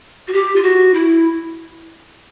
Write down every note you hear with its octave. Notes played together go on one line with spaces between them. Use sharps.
F#4
G4
F4
F#4
E4